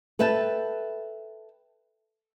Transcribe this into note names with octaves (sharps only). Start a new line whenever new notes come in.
A4 B4 E5 G5 A5